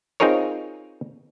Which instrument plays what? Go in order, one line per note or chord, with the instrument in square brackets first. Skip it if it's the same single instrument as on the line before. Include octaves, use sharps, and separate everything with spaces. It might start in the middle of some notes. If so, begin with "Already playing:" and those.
[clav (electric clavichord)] C4 D#4 F4 G#4 A#4 C#5